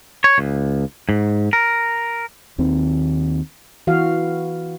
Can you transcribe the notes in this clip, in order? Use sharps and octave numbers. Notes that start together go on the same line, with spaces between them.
C#5
C#2
G#2
A#4
D#2 D#3 C4
E3 F#4 F5